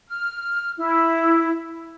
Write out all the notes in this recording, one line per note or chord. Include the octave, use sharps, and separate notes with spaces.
F6
E4